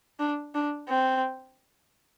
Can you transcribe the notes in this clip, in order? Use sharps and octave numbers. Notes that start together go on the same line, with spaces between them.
D4
D4
C4